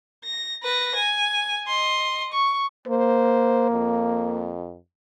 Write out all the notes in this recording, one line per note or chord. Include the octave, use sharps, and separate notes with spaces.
A#6
B4 A#6
G#5
D#5 C6
C#6
A#3 C5
F2